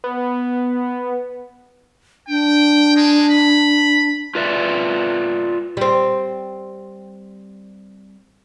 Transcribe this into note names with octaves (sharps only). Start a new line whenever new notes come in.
B3
D4 G5
G#3
B5
F4 B4 D5 E5
G3 C4